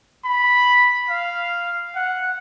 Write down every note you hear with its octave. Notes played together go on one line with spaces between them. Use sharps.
B5
F5
F#5